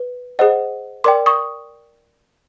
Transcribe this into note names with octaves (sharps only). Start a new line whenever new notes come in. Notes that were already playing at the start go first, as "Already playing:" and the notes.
Already playing: B4
G#4 C5 D#5 F#5
A#4 D5 G5 C6 D6
C#6 D#6